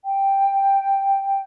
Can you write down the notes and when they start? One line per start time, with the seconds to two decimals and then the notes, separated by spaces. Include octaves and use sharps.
0.05 G5